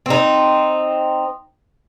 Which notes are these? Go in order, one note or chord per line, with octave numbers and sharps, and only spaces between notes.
C4 D#4